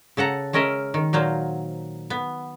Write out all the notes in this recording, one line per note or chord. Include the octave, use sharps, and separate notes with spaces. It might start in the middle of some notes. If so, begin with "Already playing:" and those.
C#3 A4 F#5 A#5
G#3 C#4 A#4 D#5 E5
D#3
A#2 F#3 A#3 C5
B3